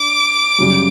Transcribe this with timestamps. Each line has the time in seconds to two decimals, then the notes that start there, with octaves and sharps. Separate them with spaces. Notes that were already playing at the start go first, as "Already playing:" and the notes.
Already playing: D4 D6
0.59 F#2 C#3 G3